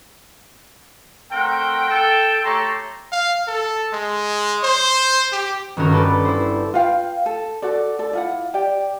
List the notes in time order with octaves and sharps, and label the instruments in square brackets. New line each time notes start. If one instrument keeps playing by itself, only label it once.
[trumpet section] A3 C4 A#4 F#5 G5
A4 G5
A3 G4 A4 C#5 A#5 C6
[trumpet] F5
A4
G#3
C5
G4
[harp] G1 D#3 C#4 F#4 A#4 C#5
G4 A4 B4 D5
E4 C5
[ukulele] F4 B4 F5 G5
A4
F#4 A4 D5
A4 D5
E4 F4 F#5
G4 D5 G5